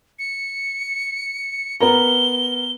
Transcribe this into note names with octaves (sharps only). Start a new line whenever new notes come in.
C#7
B3 A#4 A#5 G7